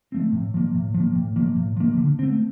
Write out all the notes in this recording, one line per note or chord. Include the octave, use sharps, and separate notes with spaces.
F3 A3 C4
A2
F3 A#3
A2
F3
A#3
A2
F3 A#3
A2
F3 A#3
D3
A3 C4